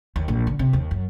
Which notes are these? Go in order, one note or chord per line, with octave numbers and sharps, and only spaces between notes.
D#2
A#1
D3
C3
D#2
F#2